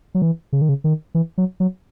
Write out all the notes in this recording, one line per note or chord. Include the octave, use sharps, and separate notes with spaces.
F#3
E3
C#3
D#3
C#3
D#3
E3
F#3
F#3